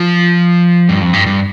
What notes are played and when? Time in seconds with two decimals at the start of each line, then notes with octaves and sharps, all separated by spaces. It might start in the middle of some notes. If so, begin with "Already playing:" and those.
Already playing: F3
0.89 G2
1.01 F2
1.13 G2
1.26 G2